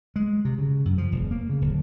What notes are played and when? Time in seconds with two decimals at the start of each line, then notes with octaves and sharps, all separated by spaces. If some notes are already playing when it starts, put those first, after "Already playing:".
0.16 G#3
0.45 C3
0.58 C#3
0.85 F#2
0.98 F3
1.12 E1
1.31 A#3
1.49 C#3
1.61 D1